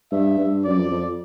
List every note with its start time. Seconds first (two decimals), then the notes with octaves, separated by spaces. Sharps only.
0.12 G2 E5
0.38 G2
0.64 F#2 D5
0.78 F2
0.91 F2